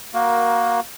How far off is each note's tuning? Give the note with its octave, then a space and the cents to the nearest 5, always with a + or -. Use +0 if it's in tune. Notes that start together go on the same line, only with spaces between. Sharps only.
A#3 +10 F#4 +0 A#4 +15